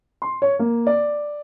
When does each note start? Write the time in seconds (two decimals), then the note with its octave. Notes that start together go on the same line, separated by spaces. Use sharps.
0.22 C6
0.42 C#5
0.59 A#3
0.87 D5